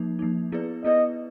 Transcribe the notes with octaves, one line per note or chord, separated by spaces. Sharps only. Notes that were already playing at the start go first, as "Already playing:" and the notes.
Already playing: F3 A#3 D#4
F3 A#3 D#4
B3 E4 G#4 B4 D5
B3 E4 G#4 B4 D5 D#5